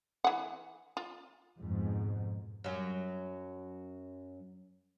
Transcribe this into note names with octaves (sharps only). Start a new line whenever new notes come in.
E3 F#5
F4
F2 G#2 B2
F#2 F#3